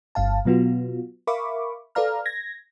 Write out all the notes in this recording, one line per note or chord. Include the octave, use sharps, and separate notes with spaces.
G1 G2 F5 A5
B2 F#3 B3 F4 F#4
A#4 E5 F5 B5 C#6 D6
A4 B4 D5 F5 A#5 F6
G#6 A#6